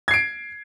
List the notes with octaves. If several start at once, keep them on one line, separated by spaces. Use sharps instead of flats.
G#6 C7 D7